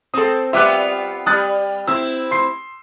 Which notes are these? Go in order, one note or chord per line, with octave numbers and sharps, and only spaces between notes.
C4 A4 D#6
G3 B3 F4 E5 D6 F#6
G3 D#6 F#6 A6
C4 E4 E6
C6 C7